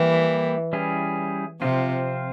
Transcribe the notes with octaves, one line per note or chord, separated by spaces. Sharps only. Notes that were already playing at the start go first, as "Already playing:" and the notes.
Already playing: E3 G3 A#3 E4 G4
G3 C#4 E4 G#4
C3 F3 C4 F4